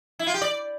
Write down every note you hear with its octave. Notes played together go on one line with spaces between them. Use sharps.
E4
F4
G4
D5